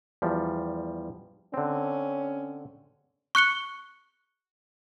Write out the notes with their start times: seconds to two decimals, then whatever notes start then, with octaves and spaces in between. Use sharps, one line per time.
0.22 E2 F3 G3
1.54 D3 C4 C#4
3.35 C#6 F#6 C#7 G7